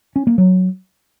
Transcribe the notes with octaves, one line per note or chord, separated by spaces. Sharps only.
C#4
A#3
F#3